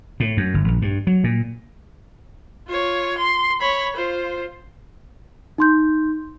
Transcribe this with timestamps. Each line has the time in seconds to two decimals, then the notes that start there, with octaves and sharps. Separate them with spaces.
0.20 A2
0.37 F#2
0.54 G1
0.68 A#1
0.82 G2
1.07 F#3
1.24 A#2
2.68 F4 C#5
3.18 C6
3.61 C#5 B5
3.96 F4 C5
5.58 D#4 C6 G6